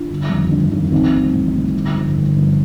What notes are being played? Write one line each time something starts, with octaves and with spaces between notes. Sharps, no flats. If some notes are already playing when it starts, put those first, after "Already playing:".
Already playing: D4 F4
G1
F2 D#3 G3
G1 D4
F2 D#3 G3 D4
A1 C4 D#4
A2 G3
A1
A2 G3
G1
G2 D3 F3
G1
G2 D3 F3